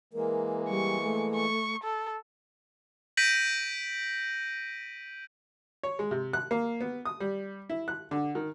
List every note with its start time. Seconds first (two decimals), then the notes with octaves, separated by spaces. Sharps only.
0.13 E3 G#3 A#3 A#4
0.70 G3 C#6
1.03 A3
1.35 C#6
1.83 A4
3.17 G6 A#6 B6 D7 D#7 F#7
5.83 C#5
5.99 G#3
6.11 C3
6.33 F#6
6.51 A#3
6.81 B3
7.05 D#6
7.20 G3
7.69 E4
7.88 F#6
8.11 D3
8.35 D#3